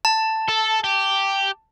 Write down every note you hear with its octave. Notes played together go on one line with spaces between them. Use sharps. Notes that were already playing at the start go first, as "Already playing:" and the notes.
A5
A4
G4